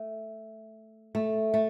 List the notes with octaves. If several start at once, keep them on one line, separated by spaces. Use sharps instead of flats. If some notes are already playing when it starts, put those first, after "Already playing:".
Already playing: A3
A3
A3